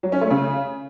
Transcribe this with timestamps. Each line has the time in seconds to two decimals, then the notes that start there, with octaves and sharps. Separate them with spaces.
0.03 F#3
0.12 C#4
0.21 A3
0.30 C#3